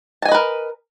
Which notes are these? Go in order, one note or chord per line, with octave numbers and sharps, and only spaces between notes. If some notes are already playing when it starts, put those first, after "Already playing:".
A#4 B4 D#5 G#5 A5